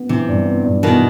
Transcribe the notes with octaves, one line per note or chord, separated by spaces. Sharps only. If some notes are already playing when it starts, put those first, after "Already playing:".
Already playing: B3
C3 E3
G2
B3
G2
B2 D#3 E3